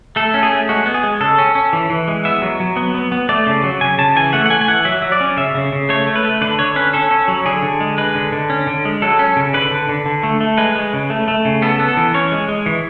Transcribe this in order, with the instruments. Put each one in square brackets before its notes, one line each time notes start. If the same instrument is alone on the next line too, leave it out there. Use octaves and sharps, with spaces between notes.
[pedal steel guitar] A3 A4
C#4
G#4
A3
G#3 F#4
B3
G#4
G#3
C#3 A4
C#4
C#4
E3
E3
G#3
B3 E5
F#3
F#3
B3
B3
B3
A3 D5
C#3
F#3
C#3 G#5
C#3 A5
E3 G#5
A3 F#5
F#5
A3 G#5
G#5
E3 F#5
F#3 E5
F#3
D5
C#4
C#3 E5
C#3
C#3
A3 C#5
A3
B4
A3
D3 B4
D3 C#5
C#4 B4
C#4 A4
C#4
F#3
D3 G#4
D3
G#3
G#3 B4
D3
D3
C#4
D3
G#3
F#3 A4
C#4
C#3
D3 B4
D3
D3
D3
A3
A3
G#3 B4
G#3
C#3
A3
A3
C#3
B3 A4
B3
A4
E3
C#4 C#5
G#3
G#3
E3